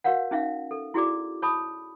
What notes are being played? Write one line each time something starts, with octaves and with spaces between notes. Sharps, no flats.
F#4 A#4 C#5 F5 F#5
C#4 D#4 E5 F5
A4
E4 F#4 G#4 D5 D6
C#5 A5 B5 D#6